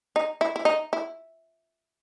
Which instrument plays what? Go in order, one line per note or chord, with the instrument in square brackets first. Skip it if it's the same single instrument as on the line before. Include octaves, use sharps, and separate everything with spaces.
[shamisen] D#4
E4
E4
D#4
E4